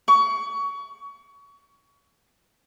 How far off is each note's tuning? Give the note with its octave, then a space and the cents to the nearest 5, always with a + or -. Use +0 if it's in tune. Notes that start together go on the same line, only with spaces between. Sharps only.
C#6 +25